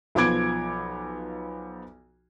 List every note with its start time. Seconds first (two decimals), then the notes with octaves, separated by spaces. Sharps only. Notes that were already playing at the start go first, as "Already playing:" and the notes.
0.15 B1 F3 B3 D6 G#6 D7